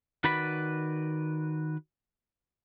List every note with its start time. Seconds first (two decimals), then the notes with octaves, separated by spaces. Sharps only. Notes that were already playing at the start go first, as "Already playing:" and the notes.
0.24 D#3 F#4 B4 D5 B5